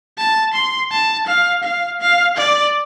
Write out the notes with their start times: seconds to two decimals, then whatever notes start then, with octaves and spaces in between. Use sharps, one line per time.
0.18 A5
0.53 C6
0.91 A5
1.27 F5
1.63 F5
2.01 F5
2.37 D5